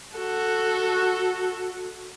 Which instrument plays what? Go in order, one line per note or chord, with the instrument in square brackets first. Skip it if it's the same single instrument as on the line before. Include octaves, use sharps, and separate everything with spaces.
[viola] F#4 A4